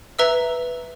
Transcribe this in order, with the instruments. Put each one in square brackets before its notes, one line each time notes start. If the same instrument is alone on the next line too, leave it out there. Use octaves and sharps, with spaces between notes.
[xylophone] B4 E5 A#5 E6